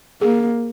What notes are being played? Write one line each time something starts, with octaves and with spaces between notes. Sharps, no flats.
A#3 G#4